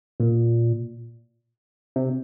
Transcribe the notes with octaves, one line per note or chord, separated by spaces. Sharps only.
A#2
C3